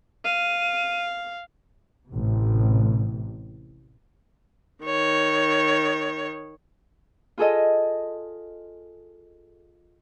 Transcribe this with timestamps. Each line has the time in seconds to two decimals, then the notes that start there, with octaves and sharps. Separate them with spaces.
0.25 F5 D#7
2.10 A1 C3
4.84 D#3 C#5
7.38 F4 G#4 A4 D#5